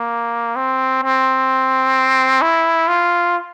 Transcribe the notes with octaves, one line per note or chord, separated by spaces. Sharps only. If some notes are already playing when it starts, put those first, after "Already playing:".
Already playing: A#3
C4
C4
E4
F4